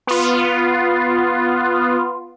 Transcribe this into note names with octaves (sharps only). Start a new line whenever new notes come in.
B3 F4